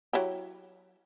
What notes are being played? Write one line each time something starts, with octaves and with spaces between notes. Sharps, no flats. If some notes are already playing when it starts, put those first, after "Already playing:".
F#3 E4 G4